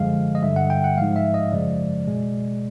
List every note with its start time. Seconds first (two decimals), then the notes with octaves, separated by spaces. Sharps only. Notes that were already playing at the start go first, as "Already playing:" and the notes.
Already playing: F#2 D3 F3 G#3 F5
0.35 D#5
0.42 G2 D3 G3 E5
0.56 F#5
0.70 G5
0.84 F#5
0.97 G#2 F3 G#3 F5
1.16 E5
1.34 D#5
1.52 F#2 C#3 F3 G#3 D5
2.07 B2 G#3